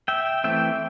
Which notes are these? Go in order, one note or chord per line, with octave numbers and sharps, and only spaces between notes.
E5 G5
E3 A3 C4 E5 G5